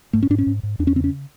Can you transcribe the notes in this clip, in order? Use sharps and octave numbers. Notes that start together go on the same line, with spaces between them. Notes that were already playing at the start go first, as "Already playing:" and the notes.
G#2 A3
C#4
G#2 D4
C#4
G#2
G#2
E2 D4
C#4
C#3 C4
C#4